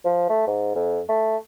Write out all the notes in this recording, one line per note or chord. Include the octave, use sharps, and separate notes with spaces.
F3
A3
G#2
F2
A3